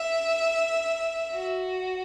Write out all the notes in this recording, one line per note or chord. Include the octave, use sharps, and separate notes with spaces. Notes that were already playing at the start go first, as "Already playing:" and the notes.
Already playing: E5
F#4